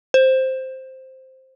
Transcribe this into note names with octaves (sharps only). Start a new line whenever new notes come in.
C5